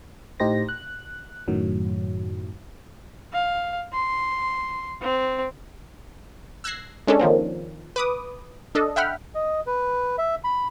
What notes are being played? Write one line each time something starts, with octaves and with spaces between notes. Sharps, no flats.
A2 D#4 G4 C5 A#6
F#6
F#2 A2 D#3 F#3
F5
C6
C4
E6 F#6 G#6 A#6 C7
G#3 C#4 D4 A4
D#3 F3 A#3 C4
B4 D6 D#6
D4 A4 D#5
E5 F#5 G5 B5 F6
D#5
B4
E5
B5